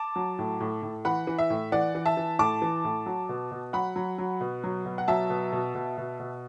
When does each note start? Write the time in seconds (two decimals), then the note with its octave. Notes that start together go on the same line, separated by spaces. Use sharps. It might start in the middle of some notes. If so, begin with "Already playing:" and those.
Already playing: A5 D6
0.16 F#3
0.39 A2
0.60 A2
0.83 A2
1.05 E3 F#5 B5
1.27 E3
1.39 E5
1.50 A2
1.72 E3 D5 F#5
1.95 E3
2.06 E5 A5
2.17 E3
2.39 A2 A5 D6
2.62 E3
2.84 A2
3.06 F#3
3.29 B2
3.51 B2
3.73 F#3 F#5 B5
3.96 F#3
4.18 F#3
4.41 B2
4.64 F#3
4.86 B2
4.98 F#5
5.08 F#3 E5 A5
5.30 B2
5.52 B2
5.75 B2
5.98 B2
6.20 B2